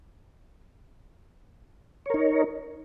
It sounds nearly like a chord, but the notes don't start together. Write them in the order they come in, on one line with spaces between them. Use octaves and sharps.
C#5 A#4 D#4